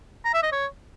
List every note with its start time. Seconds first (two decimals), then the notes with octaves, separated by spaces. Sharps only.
0.25 A#5
0.34 E5
0.43 D#5
0.52 C#5